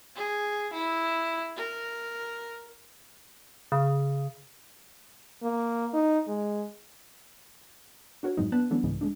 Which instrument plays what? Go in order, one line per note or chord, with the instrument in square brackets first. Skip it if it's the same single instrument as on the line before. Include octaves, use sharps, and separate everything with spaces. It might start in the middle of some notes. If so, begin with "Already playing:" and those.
[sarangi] G#4
E4
A#4
[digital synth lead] C#3
[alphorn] A#3
D#4
G#3
[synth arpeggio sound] D4 F#4 A#4 C#5
F#2 A2 F#3 G#3 C4 D#4
B3 D4 B4 A5 F#6
E3 F#3 A3 B3 C#4 D4
C2 G#2 C#3 E3 G#3
G#3 A3 D4